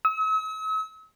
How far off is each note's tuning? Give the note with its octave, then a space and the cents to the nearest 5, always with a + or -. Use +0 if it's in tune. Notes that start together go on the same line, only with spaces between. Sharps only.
E6 -45